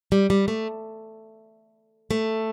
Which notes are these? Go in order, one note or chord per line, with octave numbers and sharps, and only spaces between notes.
G3
G3
A3
A3